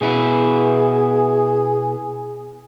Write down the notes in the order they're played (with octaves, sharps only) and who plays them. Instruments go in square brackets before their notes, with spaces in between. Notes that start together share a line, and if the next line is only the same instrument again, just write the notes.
[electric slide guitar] B2 B3 E4 [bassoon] G#4